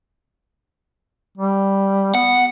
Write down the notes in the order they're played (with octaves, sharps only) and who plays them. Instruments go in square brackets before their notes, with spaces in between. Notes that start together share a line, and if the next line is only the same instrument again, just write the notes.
[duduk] G3
[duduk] B3 [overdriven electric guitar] F#5